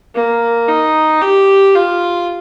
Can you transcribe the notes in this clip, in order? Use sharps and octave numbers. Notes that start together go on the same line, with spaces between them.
A#3
D#4
G4
F4